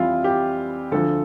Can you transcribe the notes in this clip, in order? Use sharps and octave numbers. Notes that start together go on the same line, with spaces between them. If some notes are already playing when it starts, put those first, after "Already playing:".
Already playing: F2 E3 G3 E4 F4
G4
D2 D3 F3 A4